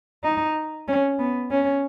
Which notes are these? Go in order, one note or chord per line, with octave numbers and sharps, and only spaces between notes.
D#4
C#4
B3
C#4